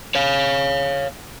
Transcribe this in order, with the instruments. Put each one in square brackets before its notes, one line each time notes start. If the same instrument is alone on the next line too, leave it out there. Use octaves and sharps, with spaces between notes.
[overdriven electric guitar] C#5 F5